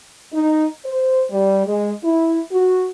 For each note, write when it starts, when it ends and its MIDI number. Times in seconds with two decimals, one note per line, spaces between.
0.33 0.66 63
0.85 1.24 72
1.31 1.64 55
1.65 1.91 56
2.03 2.41 64
2.51 2.86 66